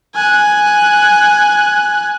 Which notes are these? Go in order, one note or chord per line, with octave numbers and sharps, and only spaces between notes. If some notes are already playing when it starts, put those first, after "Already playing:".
G#5 F#6